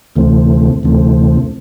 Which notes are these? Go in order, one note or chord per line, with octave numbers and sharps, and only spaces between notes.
D2 C3 E3 A3 C4
D2 C3 E3 A3 C4